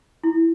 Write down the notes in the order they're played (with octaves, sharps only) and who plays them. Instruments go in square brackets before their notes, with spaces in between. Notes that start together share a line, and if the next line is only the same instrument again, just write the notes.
[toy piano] E4